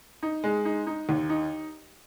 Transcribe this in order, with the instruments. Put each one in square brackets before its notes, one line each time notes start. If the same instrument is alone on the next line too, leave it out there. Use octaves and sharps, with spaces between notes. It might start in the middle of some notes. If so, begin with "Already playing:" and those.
[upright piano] D#4
G#3
D#4
D#4
D#2
D#4